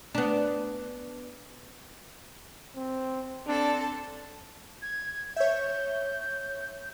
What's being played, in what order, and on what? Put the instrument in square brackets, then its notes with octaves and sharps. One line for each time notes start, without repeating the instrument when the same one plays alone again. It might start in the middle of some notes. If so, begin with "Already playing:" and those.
[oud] B3 D4
[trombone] C4
[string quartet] C4 A4 A5 [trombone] D4
[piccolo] G#6
[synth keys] C#5 E5 [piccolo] G6